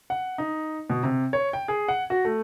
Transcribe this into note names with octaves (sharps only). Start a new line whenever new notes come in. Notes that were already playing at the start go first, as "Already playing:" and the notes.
F#5
D#4
B2
C3
C#5
G5
G#4
F#5
F#4
A3